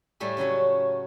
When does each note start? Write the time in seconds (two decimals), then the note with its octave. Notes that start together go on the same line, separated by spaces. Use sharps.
0.20 A2 G3 A3 G#4
0.37 C#3 F#3 A3 C#4